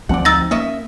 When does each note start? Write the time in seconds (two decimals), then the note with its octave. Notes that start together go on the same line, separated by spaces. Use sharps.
0.09 D2 F3 C4 D5 F#5
0.25 D#4 E6 A6 A#6
0.51 A#3 C#4 D#5 E5